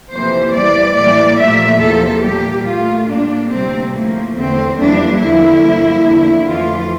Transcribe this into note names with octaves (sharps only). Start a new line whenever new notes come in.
F2 C3 E3 A#3 C5
E2 E3 G3 D5
A2 E3 G3 A#3 D5
A#2 F3 A3 E5
E2 C3 F3 A#3 A4
A#2 G3 A#3 G4
A#2 A3 F4
A2 G3 A#3 D4
D2 C3 G3 A#3 C4
A2 F3 A3 A#3
E2 D3 A3 C4
F2 E3 G3 A#3 D4
E2 D3 F3 A#3 E4
G2 F3 A#3
E2 D3 F3
F2 E3 A3 F4